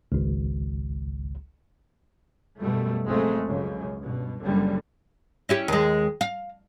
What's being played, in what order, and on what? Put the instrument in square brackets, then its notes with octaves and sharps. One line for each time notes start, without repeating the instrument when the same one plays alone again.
[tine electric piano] G#1 C#2
[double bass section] F#2 B2 G3 A3
F#1 F2 G#3 A3
C#2 F#2 C#3
G2 B2
F#1 F#2 D3 G3
[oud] C#4 E4 G4
D#2 G#3
F5